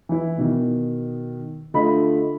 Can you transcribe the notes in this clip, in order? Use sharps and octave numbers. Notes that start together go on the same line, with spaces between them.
E3 E4
B2 D#3
D3 A3 F4 D#5 B5